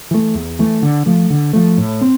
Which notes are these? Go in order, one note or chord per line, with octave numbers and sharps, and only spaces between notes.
E3 A3
E2
E3 A3
D3
F3 A3
D3
F3 A3
A2
C4